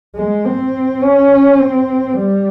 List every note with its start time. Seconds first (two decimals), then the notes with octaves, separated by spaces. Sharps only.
0.15 G#3
0.45 C4
1.03 C#4
1.59 C4
2.17 G3